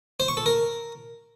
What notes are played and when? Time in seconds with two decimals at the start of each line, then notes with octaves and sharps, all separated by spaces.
0.20 C5
0.28 C#6
0.37 A4
0.46 A#4